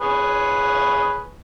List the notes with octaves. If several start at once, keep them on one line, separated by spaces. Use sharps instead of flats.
G#4 B4 C#5